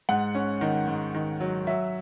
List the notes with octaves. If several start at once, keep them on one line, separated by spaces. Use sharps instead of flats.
G#2 F#5
C#4
D#3
G#2
D#3
F#3
F#3 E5